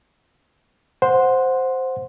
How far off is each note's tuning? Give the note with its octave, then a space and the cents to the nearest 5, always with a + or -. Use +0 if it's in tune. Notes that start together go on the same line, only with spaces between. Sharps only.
C5 +0 F#5 -15